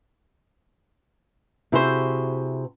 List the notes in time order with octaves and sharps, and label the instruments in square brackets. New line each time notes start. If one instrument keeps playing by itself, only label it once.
[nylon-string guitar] C3 E4 F#4 G#4 B4 C5